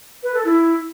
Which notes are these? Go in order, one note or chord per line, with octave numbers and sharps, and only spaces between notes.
B4
A4
E4